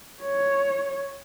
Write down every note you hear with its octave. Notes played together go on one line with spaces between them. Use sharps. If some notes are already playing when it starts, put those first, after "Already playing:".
C#5